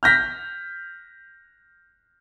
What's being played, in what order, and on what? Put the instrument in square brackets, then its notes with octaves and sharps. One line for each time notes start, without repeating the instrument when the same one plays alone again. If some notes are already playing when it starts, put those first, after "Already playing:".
[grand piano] F6 G6 A#6 B6